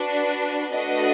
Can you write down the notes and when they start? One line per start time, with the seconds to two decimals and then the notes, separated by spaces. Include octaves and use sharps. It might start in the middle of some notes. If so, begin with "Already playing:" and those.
Already playing: D4 F#4 B4
0.73 A3 D4 F#4 B4 D#5